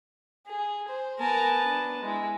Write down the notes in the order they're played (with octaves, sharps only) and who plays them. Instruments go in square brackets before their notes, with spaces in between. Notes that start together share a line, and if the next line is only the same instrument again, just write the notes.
[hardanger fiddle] G#4
C5
[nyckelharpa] B3 A5 [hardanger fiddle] A#4 G#5
[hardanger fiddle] D4
G#3 E4